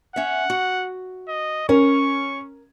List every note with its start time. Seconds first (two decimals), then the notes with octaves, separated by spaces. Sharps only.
0.16 C#4 E5 F#5
0.50 F#4
1.29 D#5
1.69 C#4 A#4 C#6